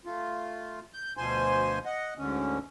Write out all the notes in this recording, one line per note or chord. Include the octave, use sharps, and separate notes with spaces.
A3 F4
G6
D2 B2 F3 C5 G#5 C6
D#5 F#5
D2 G#2 D3 C#4